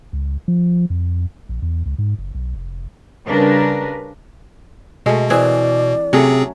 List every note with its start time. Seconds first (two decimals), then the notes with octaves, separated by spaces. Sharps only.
0.13 C#2
0.48 F3
0.90 F2
1.49 A#1
1.62 E2
1.86 C#2
1.98 G#2
2.18 F#1
2.35 B1
2.55 F1
3.27 C#3 G3 D4 A#4 B4
5.06 B2 G#3 A3
5.30 E3 C4 G#4 D5
6.13 C3 F#3 A3 C4 C#4 G#4